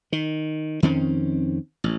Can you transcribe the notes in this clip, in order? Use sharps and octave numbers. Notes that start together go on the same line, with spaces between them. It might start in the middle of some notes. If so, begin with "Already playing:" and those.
D#3
F2 D#3 C4 C#4
A1